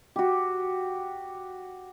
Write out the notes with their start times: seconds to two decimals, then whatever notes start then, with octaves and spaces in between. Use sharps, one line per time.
0.16 F#4 G4